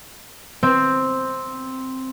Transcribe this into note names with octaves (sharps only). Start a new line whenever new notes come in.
C4